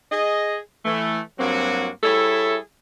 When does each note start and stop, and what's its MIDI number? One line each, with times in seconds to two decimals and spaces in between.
0.12 0.58 68
0.12 0.58 75
0.85 1.20 52
0.85 1.20 57
1.39 1.89 43
1.39 1.89 54
1.39 1.89 58
1.39 1.89 60
1.39 1.89 66
2.03 2.58 55
2.03 2.58 64
2.03 2.58 68
2.03 2.58 69
2.03 2.58 73
2.03 2.58 76